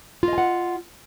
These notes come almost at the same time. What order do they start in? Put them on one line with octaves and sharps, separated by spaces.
F4 D#5 G#5 F#5